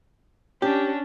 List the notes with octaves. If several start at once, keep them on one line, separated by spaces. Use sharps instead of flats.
C#4 D4 G4